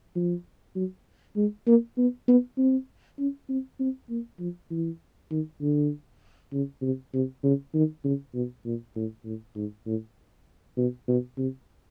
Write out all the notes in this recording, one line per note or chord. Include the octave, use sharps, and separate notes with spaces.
F3
F#3
G#3
A#3
B3
B3
C4
C#4
C4
C4
A#3
F3
E3
D#3
D3
C#3
C3
C3
C#3
D#3
C#3
B2
A#2
A2
A2
G#2
A2
B2
B2
C3